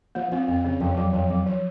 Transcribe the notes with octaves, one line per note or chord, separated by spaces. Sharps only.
F3 A#3
F3 C4
F2 C4
C#3 C4
F2 F3
F3
F2 F#3
F2 F3
F2 F#3
F3